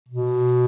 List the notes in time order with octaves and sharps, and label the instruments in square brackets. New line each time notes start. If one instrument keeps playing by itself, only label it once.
[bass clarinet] B2